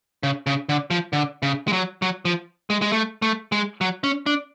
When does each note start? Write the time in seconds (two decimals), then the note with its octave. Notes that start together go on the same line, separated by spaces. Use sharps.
0.23 C#3
0.47 C#3
0.69 D3
0.91 F3
1.13 D3
1.43 C#3
1.68 G#3
1.73 F#3
2.02 F#3
2.25 F3
2.70 G#3
2.82 G#3
2.92 A3
3.22 A3
3.52 G#3
3.81 F#3
4.04 C#4
4.26 D4